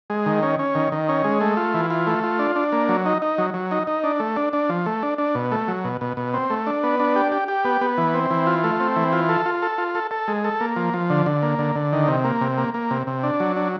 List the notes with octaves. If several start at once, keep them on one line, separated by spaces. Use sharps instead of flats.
G#3
D#3
C#4
C#4
D#3
D#3
C#4
G#3
A3
F4
E3
F4
A3
F4
D4
D4
A#3
F#3
D#4
D#4
F#3
F#3
D#4
D#4
D4
A3
D4
D4
F3
A3
D4
D4
B2
A3
F#3
B2
B2
B2
C4
A3
D4
B3
D4
G4
G4
G4
B3
B3
E3
C4
E3
F4
A3
C4
E3
F4
A4
F4
A4
F4
A4
A4
G#3
A4
A#3
F3
F3
D3
D3
A#3
D3
D3
D#3
C3
A#3
C3
A#3
A#3
C3
C3
D4
F#3
D4